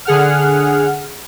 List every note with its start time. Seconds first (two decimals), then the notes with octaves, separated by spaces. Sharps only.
0.05 D3 G#4 F#5 F6